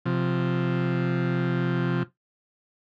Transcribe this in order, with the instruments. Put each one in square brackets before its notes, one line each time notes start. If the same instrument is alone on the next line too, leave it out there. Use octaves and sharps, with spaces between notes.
[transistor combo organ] C3 F3